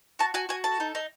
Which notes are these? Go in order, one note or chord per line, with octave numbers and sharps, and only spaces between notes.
F#4 A5
F#4 G#5
F#4 G#5
A4 A5
D#4
D#4